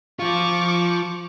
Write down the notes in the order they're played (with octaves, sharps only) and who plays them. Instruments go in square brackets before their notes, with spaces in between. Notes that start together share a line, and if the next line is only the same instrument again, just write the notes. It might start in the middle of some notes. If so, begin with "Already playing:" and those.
[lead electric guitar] F3 F4 [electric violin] C#6 D6